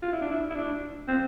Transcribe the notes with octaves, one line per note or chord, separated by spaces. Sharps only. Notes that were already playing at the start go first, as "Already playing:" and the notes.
F4
E4
D4
E4
E4
D4
C4